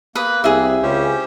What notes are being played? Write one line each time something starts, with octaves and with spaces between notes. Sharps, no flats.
A#3 B4 D#6
C2 G4 G#4 E5
C#2 C#3 C#4 G4 C5